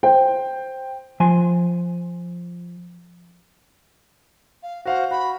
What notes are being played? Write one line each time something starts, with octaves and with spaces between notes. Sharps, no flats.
C5 G5
F3 G#5 C6
F5
F#4 C5 F5 F#5
F#4 B5